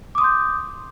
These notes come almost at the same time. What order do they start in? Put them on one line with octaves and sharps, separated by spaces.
D6 D#6 C6 G6